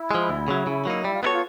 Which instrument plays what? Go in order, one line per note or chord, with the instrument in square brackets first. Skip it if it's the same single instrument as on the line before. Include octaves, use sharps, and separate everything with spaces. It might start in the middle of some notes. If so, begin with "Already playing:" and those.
Already playing: [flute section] E4
[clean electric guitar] F3 G#3
D2
C#3 F#3
C#3
F#3 A#3 D#4
[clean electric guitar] G3 [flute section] E4
[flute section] F4
[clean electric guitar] B3 E4 A4 C#5 [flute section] F#4
[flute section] F4